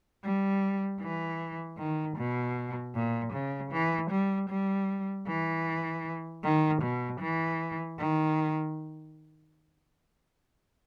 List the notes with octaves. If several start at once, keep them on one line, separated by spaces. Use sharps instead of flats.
G3
E3
D#3
B2
A#2
C#3
E3
G3
G3
E3
D#3
B2
E3
D#3